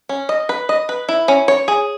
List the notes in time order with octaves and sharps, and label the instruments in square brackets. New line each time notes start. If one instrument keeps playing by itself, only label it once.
[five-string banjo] C#4
D#5
B4
D#5
B4
E4
C#4
C#5
G#4